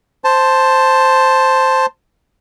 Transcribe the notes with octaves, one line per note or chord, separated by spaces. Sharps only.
C5 A5